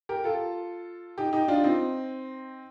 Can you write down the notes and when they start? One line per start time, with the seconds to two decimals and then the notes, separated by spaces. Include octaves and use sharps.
0.09 G4 A#4
0.24 F4 A4
1.18 D#4 G4
1.33 D#4 G4
1.48 D4 F4
1.64 C4 D#4